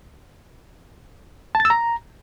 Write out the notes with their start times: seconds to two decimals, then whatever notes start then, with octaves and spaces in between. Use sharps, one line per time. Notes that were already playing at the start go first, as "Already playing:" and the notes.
1.55 A5
1.60 A6
1.65 E6
1.70 A#5